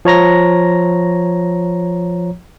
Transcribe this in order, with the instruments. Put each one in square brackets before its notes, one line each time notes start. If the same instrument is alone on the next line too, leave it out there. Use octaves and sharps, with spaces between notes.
[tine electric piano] F3 C#5 A#5 A#6